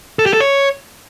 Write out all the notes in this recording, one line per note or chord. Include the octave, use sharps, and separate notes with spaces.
A4
G4
A4
C#5